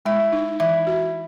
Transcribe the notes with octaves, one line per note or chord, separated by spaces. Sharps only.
G#3 E4
D#4
E3 E4
F#4